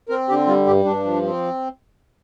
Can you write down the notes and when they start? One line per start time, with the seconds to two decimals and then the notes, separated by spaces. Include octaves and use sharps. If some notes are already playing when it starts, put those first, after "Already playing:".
0.09 C4 A#4
0.28 D3 G4
0.47 G3 F4
0.66 G2 G4
0.85 G2 D4
1.04 F3
1.23 C4